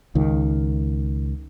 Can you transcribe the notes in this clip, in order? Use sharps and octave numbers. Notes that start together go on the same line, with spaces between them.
C#2 D#3